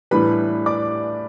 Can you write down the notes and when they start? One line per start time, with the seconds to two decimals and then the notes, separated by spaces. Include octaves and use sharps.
0.11 A2 E3 G3 D4 B4 B5
0.66 D5 D6